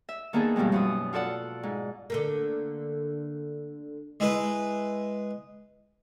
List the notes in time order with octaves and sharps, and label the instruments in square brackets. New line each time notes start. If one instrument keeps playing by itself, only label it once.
[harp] E5
D#3 A#3 B3 D4 G#4 A4
G2 B2 F3 G3 G#3
F#2 B2 D#6
F4 F#4 A4 D5 F#5
G#2
[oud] D3 A3 A#3
[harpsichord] G#3 E4 B4